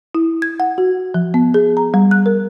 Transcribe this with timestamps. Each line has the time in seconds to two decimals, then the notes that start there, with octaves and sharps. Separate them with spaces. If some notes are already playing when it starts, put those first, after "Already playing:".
0.15 E4
0.42 G#6
0.60 F#5
0.78 F#4
1.14 F3
1.34 B3
1.54 G#4
1.77 A#5
1.94 G3
2.11 F#6
2.26 A#4